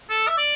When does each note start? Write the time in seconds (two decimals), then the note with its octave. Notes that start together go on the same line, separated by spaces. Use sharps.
0.10 A4
0.28 E5
0.38 D5